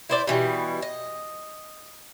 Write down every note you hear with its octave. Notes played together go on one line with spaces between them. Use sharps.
E4 C5 D5
B2 E3 G3
D#5